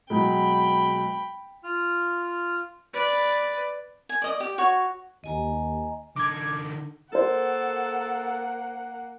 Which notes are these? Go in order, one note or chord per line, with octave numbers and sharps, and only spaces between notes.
B2 F#3 G#3 G5 B5
F4 F6
B4 D5
G#5
D5 D#5 D#6
G4
F#4 C#5
D#2 D#5 G#5 A#5
D3 D#4 D6 G#6
A#3 A4 A#4 C5 F#5